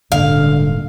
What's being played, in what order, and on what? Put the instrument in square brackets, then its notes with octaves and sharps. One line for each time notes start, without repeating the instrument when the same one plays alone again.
[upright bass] D#1 G#2 [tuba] D3 [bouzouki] F5